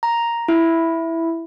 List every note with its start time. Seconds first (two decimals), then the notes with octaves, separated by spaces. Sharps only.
0.03 A#5
0.48 E4